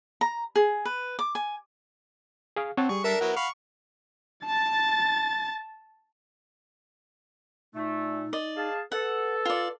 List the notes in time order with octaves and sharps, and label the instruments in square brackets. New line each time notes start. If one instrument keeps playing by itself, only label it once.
[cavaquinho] A#5
G#4
B4
D6
G#5
[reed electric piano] G#4 F5
[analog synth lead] C4 [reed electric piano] C#5 F#5 A5
[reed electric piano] G3 [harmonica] G#4 [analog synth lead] C#6
[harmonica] D4 A4 E5 [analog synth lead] A#4
[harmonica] F#3 B3 E4 [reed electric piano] F#5
[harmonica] F5 B5 [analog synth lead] C#6
[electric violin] A5 A6
[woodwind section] A#2 A3 [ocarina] D#4
[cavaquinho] D5 D#5
[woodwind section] G#4 F5 A5
[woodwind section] A4 [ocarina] B4 [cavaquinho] F#5
[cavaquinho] F4 D5